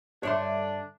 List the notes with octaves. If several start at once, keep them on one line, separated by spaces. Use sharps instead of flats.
G2 D3 D4 C#5 E5 C6